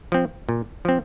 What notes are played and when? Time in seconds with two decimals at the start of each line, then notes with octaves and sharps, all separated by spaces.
0.12 F3 C4
0.49 A#2
0.85 F3 C4